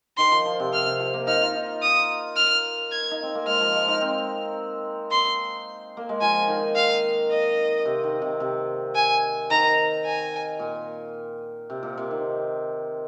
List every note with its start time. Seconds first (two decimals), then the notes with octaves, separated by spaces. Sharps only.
0.17 D#3 C6
0.31 F3
0.45 F3
0.60 C3
0.73 C3 F6
0.86 C3
1.00 F3
1.14 A#3
1.27 D#4 F6
1.42 F4
1.56 D#4
1.82 D#6
2.37 F6
2.92 G#6
3.11 D#4
3.23 C4
3.35 A#3
3.47 G#3 F6
3.61 F3
3.74 G#3
3.88 D#4
4.01 C4
5.11 C6
5.97 A#3
6.09 G#3
6.21 F3 G#5
6.48 D#3
6.76 F5
7.31 D#5
7.85 C3
8.04 D#3
8.22 C3
8.40 C3
8.95 G#5
9.50 D#3 A#5
10.05 G#5
10.59 A#2
11.70 C3
11.83 A#2
11.98 C3
12.11 D#3